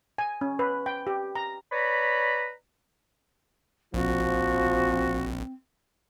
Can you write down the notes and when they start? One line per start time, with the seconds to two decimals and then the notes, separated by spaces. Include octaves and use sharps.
0.18 G#5
0.41 C#4
0.59 B4
0.86 G5
1.07 G4
1.35 A#5
1.72 B4 C#5 D5 A#5 B5
3.94 A#1 F3 C4 F#4